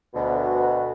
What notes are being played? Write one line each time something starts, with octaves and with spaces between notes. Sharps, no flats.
D2 B2